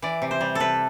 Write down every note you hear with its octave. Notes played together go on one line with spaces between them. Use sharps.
E3 D5
C3
C5
G3
C3 A4 B4